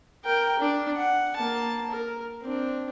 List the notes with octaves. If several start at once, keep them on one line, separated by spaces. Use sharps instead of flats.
A#4 G5
D4
F#5
A#3 A5
A#4
C4 D4